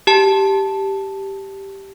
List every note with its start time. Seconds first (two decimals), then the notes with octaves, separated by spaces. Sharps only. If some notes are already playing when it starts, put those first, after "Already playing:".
0.07 G4 A5